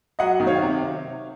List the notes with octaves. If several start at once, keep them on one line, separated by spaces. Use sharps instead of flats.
F#3 D#5 F#5
D#3
C#5 F5
C3